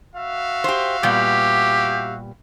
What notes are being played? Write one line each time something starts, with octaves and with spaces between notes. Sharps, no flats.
F#4 E5 F5
G4 C5
A#2 G3 B3 G4